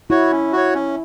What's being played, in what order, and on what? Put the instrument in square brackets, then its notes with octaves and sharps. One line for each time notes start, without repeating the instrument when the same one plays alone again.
[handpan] E4 [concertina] F#4 C#5
[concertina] C#4
F#4 C#5
C#4